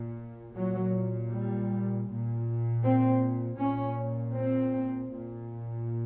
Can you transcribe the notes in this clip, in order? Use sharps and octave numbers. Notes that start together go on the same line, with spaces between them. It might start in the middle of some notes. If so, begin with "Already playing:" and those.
Already playing: A#2
A#2 F#3
G3
A#2
C4
A#2 C#4
C4
A#2